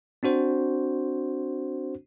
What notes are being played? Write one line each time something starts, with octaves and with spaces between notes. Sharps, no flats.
C4 D4 F#4 C5